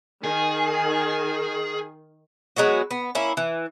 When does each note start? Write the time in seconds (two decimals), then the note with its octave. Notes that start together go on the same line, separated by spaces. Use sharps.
0.24 D#3 G#4
2.56 F#3 G#3 B3 F#4
2.91 B3
3.15 A#3 C#4 E4
3.37 E3